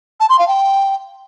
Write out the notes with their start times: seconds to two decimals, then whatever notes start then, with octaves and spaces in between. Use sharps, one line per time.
0.20 A5
0.30 C6
0.39 F5
0.48 G5